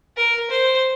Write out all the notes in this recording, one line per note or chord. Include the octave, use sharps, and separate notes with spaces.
A#4
C5